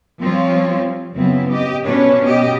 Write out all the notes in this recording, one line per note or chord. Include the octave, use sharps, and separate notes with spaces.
F3 G3 C4 F4 C#5
F#2 C#3 B3 C4 E4
G4 D#5
B2 C#4 D4 B4 C#5
B2 G4 D#5